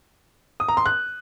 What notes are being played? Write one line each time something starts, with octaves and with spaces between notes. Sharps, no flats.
D#6
A#5
C6
F#6